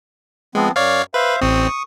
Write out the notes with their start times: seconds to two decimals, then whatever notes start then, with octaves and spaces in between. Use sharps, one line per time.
0.55 F3 G#3 B3 C4
0.76 F#2 C#5 D5 F5
1.14 B4 C5 E5 F5
1.41 A1 C4 C#6 D#6